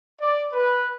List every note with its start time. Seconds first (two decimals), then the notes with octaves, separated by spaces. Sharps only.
0.21 D5
0.53 B4